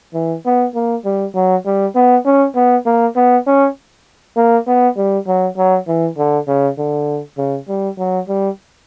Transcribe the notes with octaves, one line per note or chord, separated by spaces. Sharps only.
E3
B3
A#3
G3
F#3
G3
B3
C#4
B3
A#3
B3
C#4
A#3
B3
G3
F#3
F#3
E3
D3
C#3
D3
C#3
G3
F#3
G3